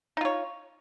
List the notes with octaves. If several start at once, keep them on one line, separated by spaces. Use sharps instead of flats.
D#4 F4 C#5